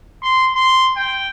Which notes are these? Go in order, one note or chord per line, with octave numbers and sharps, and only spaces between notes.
C6
C6
G5